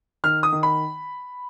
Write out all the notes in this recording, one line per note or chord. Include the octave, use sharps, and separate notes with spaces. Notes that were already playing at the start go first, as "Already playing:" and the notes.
D#3 F6
D#6
D#3
B5